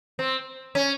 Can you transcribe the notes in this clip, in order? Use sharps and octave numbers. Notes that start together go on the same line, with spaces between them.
C4
C#4